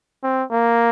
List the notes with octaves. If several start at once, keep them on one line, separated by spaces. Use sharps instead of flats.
C4
A#3